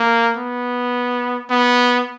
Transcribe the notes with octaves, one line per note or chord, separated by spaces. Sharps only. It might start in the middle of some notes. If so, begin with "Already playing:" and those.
Already playing: A#3
B3
B3